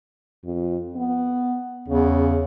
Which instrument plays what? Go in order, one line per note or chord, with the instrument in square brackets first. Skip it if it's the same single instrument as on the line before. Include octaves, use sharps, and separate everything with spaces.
[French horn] F2
B3
[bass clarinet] E2 [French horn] C#3